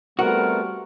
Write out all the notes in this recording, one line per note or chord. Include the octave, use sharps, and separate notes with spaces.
G3 A3 B3 C4 F#4 A#4